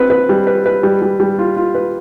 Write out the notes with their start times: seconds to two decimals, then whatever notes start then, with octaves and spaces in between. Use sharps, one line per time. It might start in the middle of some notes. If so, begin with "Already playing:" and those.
Already playing: C4 B4
0.10 B4
0.29 G3
0.47 B4
0.66 B4
0.83 G3
1.02 G3
1.20 G3
1.39 F4
1.57 F4
1.75 B4